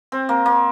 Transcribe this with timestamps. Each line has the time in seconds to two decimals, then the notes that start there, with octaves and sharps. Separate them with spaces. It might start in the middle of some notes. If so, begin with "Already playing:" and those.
0.12 C4
0.29 A#3
0.46 A#3